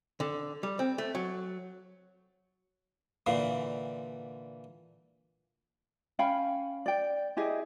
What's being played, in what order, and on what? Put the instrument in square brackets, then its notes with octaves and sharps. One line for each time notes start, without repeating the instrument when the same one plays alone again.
[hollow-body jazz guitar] D3
G3
C4
A3
F#3
[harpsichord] A#2 D3 E3 [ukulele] F5
[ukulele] C#4 F5 G5 B5
D5 G5
E4 G4 G#4 D#5